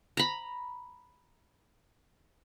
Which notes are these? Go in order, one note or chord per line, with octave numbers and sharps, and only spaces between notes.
A#5 B5